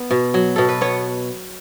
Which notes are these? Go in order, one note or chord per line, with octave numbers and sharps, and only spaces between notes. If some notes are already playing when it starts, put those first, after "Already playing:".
Already playing: B3
B2
F#3
B2 A4
B4
B3 C#5